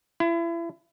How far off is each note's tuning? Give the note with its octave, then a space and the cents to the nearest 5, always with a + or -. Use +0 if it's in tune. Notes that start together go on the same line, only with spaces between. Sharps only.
E4 +35